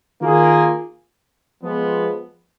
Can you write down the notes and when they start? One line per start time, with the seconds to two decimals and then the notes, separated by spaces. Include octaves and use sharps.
0.21 D#3 A#3 F4 G#4
1.62 F3 G#3 B3